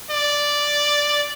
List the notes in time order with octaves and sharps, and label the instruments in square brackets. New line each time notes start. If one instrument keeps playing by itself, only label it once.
[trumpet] D5